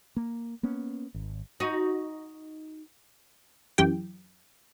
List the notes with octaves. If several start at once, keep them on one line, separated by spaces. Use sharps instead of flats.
A#3
A#3 B3 C#4
G#1
D#4 F#4
F#2 E3 G4 G5